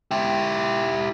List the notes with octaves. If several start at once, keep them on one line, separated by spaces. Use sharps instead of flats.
E4 G4